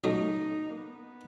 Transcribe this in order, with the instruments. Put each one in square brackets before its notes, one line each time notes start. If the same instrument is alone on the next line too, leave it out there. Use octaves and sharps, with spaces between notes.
[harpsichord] C#2 B2 F#3 A3 [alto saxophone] D#4
[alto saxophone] A#3
B3